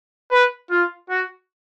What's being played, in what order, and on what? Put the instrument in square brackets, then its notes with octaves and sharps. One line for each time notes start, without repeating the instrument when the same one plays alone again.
[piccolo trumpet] B4
F4
F#4